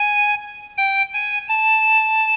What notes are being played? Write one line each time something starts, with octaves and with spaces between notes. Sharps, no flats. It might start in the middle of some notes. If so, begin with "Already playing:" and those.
Already playing: G#5
G5
G#5
A5